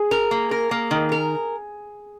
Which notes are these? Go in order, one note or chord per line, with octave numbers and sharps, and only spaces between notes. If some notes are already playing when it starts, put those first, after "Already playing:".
Already playing: G#4
A#4
A#3
A#4
A#3
D#3
A#4